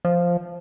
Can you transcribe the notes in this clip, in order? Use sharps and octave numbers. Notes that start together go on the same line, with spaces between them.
F3